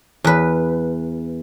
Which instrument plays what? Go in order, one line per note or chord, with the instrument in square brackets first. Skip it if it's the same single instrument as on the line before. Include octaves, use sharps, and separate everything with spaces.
[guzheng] E2 B4